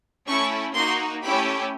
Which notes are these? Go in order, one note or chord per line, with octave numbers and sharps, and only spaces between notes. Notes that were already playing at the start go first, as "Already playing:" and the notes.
A3 C#4 E4 C#6
A#3 D#4 F#4 C6
A3 C#4 E4 G4 B5